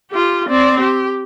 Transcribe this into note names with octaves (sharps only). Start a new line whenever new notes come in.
F4 G4
C4 D5
G4